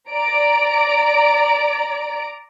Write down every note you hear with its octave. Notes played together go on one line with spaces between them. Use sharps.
D5 A#5 D7